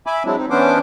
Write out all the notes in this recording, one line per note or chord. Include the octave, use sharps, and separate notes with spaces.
E5 G#5 B5 D6
F#3 G#3 C4 D4 E4
C4 D#4
E3 B3 C#4 D4 C5 D6